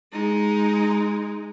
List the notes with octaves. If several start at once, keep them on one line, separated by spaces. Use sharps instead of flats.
G#3 D#4